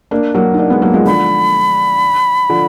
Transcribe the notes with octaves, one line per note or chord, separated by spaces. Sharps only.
A#3 D4
F#3 A#3
D#4
A#3 D4
G#3 B3
F#3 A#3
F3 G#3
D3 F3 B5
D3 F3